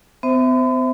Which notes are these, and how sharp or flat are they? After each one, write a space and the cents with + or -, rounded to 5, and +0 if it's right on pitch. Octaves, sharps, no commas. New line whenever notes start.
B3 +45 C5 +0 E5 +0